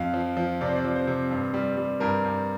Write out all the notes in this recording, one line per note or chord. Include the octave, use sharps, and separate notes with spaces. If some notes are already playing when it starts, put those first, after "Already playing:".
Already playing: F2 F5
F3
F3
C3 D5
C5
D5
F3
C5
C3
G2
G3
G3
G2 A#4
G2